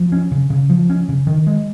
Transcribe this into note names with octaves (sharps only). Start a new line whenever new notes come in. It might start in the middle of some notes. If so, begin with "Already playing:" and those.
Already playing: F3
C#4
C#3
C#3
F3
C#4
C#3
D#3
G#3